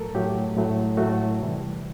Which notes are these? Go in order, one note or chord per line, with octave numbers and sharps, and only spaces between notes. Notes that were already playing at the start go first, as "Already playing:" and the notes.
Already playing: A2 F#3 A3 A4 A#4
A2 F#3 A3 G4
A2 F#3 A3
A2 F#3 A3 F#4
C3 E3 G3